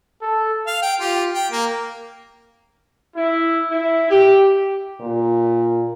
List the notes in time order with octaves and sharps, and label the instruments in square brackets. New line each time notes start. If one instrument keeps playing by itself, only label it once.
[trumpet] A4
[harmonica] F5
G5
F4 G4
G5
A#3
[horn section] E4
E4
G4
[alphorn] A#2